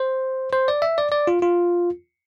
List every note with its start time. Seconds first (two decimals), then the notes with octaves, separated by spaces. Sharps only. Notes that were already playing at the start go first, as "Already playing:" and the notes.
Already playing: C5
0.53 C5
0.68 D5
0.82 E5
0.98 D5
1.12 D5
1.27 F4
1.42 F4